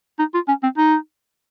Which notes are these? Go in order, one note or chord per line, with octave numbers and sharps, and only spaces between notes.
D#4
F4
C#4
C4
D#4